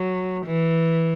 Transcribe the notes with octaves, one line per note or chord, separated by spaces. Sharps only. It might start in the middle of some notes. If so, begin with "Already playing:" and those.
Already playing: F#3
E3